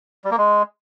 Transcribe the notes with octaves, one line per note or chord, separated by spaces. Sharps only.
G3
A#3
G#3